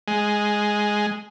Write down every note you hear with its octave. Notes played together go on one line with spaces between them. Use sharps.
G#3